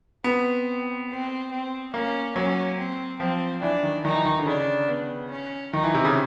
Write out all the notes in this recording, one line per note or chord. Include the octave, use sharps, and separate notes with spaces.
B3 C4
C4
C4
A#3 C#4
F#3 C#4
C4
F3 C4
E3 D4
D#3
D#3 D#4
E3
D#3
D3
C#3 D4
B3
C#4
D#3 D#4
E3
C3
C#3